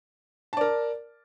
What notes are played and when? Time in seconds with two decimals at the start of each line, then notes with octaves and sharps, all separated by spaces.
0.53 A5
0.57 D5
0.61 A#4